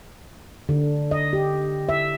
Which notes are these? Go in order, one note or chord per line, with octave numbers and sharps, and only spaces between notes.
D3
D#5
G4
E5